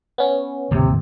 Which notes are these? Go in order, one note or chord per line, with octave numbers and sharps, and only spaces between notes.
B3 C#4
D1 D#2 G#2 C3